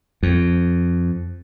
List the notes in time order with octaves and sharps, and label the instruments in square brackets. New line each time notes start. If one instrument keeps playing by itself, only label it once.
[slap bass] F2